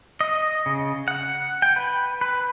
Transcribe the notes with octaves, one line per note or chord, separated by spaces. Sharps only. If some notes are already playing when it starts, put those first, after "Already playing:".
D#5
C#3
F#5
G5
B4
B4